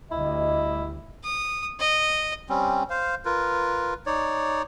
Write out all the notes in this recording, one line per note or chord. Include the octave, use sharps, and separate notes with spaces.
D2 G3 E4 D#5
D#6
D#5
G3 C4 C#4
C5 F5
F4 A#4 B4
D#4 C#5 D5